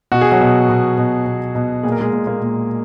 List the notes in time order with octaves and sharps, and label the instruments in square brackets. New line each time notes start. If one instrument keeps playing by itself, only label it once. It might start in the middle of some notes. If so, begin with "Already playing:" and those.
[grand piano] B2 F#4
G#4
F#3 F#4
B2
B2
B2
B2
B2
A#2 G#4
A#4
G#3 G#4
A#2
A#3 A#4
A#2